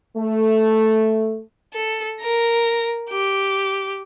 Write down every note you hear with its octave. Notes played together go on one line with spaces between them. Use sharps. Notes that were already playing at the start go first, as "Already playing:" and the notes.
A3
A4
A#4 A#6
G4